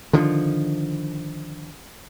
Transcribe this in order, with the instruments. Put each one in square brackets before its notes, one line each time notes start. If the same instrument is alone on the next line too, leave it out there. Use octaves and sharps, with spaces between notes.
[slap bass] D3 D#3 F3